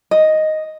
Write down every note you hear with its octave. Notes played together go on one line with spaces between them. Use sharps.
D#5